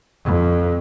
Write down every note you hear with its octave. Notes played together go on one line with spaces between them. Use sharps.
F2